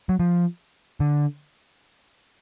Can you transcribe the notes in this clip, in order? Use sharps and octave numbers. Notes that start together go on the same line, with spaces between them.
F#3
F3
D3